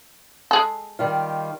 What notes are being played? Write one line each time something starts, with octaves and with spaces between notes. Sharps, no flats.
G#3 G#4 A4
D#3 G3 F4